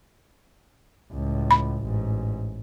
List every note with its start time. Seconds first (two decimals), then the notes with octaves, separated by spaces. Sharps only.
1.13 C#2 A2
1.51 B5
1.84 A1 G#2